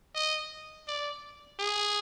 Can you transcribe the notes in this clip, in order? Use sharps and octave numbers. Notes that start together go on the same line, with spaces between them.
D#5
D5
G#4